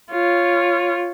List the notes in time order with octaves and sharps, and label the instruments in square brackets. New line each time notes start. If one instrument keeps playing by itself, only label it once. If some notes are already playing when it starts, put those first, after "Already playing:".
[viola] F4 C#5